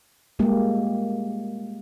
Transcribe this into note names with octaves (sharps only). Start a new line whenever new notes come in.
G3 G#3 A#3 G4